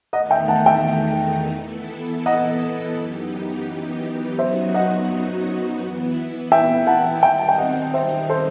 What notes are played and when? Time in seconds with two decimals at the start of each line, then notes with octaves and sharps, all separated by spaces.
0.13 E2 D#3 A3 D#4 D#5 F#5
0.31 E5 G5
0.48 F#5 A5
0.66 E5 G5
1.55 E3 B3 E4 A4
2.26 D#5 F#5
2.97 F#2 E3 B3 D#4 G4
4.39 F#2 F#3 B3 D#4 F#4 C5 E5
4.74 D#5 F#5
5.80 E3 B3 E4
6.52 E5 G5
6.87 F#5 A5
7.22 D#3 G3 C4 D#4 E5 G5
7.39 A5
7.49 G5
7.58 D#5 F#5
7.94 C5 E5
8.29 A4 C5